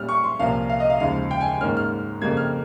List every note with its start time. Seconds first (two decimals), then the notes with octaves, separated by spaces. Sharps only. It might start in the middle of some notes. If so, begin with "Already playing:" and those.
Already playing: A#2 G3 C#4 F6
0.09 C#6
0.24 C6
0.39 C2 A#2 F3 A#3 C#4 F5
0.70 F5
0.80 D#5
0.90 F5
1.00 D#2 C#3 F3 G#3 F5
1.31 G5
1.41 G#5
1.61 G#2 D#3 A#3 C#4 F6
1.77 F6
2.22 F2 C#3 G3 A#3 G#6
2.37 F6